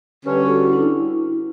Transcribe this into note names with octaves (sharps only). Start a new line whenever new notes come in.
D3 G3 C#4 G4 B4
F#4 A4
E4
D4
E4